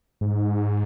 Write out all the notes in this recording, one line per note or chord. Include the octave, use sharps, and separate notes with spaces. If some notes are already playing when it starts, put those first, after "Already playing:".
G#2